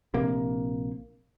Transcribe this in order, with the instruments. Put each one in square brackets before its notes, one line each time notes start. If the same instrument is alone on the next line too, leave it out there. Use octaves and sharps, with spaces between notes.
[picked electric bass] A#1 C3 A#3